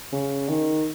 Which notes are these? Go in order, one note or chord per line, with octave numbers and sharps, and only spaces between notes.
C#3
D#3